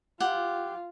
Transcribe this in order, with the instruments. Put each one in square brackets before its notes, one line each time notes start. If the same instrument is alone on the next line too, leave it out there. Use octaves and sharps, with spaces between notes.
[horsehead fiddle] F4 [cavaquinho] G4 F#5